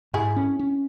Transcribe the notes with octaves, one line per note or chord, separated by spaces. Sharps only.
G#2 E4 G#4
C#4
C#4